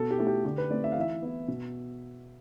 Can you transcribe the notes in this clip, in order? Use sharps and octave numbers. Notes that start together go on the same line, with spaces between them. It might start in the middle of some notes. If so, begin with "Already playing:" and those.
Already playing: B2 A4
G4
A3 E4 A4
G4
D3 G4
B4
A3 C4 D5
E5
F5
E3 E5
B3 E4
B2